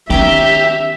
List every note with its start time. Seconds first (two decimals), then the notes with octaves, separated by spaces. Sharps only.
0.10 D#3 B3 C#4 D#4 G4 E5 A#5